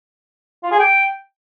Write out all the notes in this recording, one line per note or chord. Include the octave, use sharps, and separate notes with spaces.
F4
G#4
G5